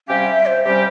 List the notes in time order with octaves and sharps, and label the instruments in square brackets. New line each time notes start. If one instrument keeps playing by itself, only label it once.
[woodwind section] C3 G3 C#4 G4 [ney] F5
[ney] E5
C5
[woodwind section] C3 G3 C#4 G4 [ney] C5